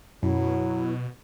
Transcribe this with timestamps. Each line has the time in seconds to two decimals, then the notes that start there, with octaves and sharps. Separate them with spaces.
0.23 F#2 B2 F#3 E4